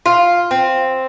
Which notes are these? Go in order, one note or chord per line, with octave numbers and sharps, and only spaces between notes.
F4
C4